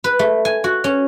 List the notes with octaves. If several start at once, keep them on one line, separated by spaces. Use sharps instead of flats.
B4
A3
G#5
F#4
C#4